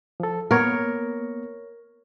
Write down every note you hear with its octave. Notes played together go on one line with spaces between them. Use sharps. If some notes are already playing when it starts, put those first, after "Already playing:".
F3 A4
A#3 B3 A#4 C#5